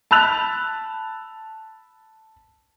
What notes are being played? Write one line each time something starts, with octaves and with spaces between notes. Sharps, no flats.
A5 B5 E6 F#6 F7